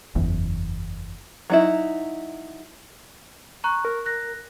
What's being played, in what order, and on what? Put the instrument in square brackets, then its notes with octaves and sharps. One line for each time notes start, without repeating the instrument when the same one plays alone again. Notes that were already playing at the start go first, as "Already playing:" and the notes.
[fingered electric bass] F#1 E2
[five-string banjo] F#3 D#4 E4
[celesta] A#5 C#6 F#6
[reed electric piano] A#4
[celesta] F#6 A#6